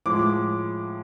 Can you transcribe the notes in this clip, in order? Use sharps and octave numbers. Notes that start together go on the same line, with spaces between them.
A2 F3 G#3 D6